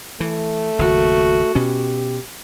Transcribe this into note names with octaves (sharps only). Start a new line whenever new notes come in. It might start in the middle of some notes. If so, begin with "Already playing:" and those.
E3 A3
F#1 D#2 F#4
B2 C#4 G4